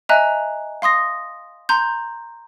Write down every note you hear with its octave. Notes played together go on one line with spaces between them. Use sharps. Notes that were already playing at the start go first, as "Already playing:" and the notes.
D#5 E5 G#5 A#5 F#6
F5 C6 D#6 A#6
A#5 C6 G6